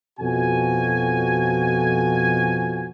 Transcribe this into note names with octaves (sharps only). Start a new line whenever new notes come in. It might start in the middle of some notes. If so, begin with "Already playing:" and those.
F2 B2 F3 F#4 A4 G#5